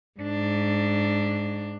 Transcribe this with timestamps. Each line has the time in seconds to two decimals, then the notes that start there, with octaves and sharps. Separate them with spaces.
0.20 G#2 D4